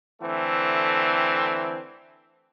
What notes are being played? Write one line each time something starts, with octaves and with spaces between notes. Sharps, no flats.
D3 E3 A3 C4